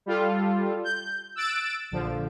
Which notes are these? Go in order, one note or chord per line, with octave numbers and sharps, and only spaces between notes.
G3 F4 A4
G6
E6 F#6 A6 D7 E7
A#1 D3 F3